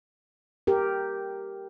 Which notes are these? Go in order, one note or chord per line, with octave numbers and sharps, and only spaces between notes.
G4 A#4